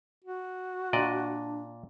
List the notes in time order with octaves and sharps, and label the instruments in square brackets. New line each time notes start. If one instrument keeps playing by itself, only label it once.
[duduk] F#4
[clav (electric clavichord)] A#2 D5 D#5 [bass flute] D4